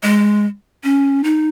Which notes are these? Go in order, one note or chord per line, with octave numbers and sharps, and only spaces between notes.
G#3
C#4
D#4